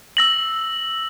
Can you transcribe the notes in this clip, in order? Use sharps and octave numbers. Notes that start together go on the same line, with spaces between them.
E6 A#6 F#7